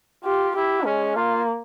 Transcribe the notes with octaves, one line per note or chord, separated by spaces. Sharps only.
F4 G4
E4 G4
G#3 C#4
A#3 F4